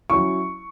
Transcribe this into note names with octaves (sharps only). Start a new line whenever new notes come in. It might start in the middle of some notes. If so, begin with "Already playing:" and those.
F#3 C#4 E4 C#6